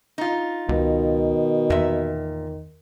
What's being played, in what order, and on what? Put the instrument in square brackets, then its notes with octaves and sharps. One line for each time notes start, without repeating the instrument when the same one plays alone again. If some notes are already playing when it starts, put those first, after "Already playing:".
[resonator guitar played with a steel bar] D#4 F4
[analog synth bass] C#2 [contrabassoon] B2 [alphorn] D#3
[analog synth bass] E2 [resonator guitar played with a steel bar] A#2 E5